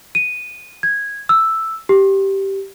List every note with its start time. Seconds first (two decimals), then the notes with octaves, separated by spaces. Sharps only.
0.15 D#7
0.83 G#6
1.29 E6
1.89 G4